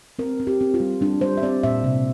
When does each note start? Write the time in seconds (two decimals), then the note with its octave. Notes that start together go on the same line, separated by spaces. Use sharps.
0.19 C4 A#4
0.40 C4
0.47 G4
0.61 C4
0.74 F4
0.80 G3
1.01 G3 D4
1.21 G3 C5
1.37 E5
1.42 C4 D5
1.63 A#2 E5
1.84 C3